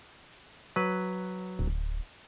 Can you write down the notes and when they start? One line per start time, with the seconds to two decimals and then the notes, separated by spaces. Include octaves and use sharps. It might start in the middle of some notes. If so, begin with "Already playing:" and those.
0.76 F#3 B4
1.59 D1